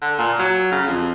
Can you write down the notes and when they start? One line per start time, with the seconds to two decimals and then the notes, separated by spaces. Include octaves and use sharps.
0.01 D3
0.18 A#2
0.39 F#3
0.72 C#3
0.87 F2